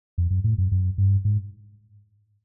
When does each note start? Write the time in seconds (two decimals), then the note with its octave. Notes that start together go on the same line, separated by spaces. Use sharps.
0.18 F2
0.30 F#2
0.44 A2
0.58 F#2
0.72 F#2
0.98 G2
1.25 G#2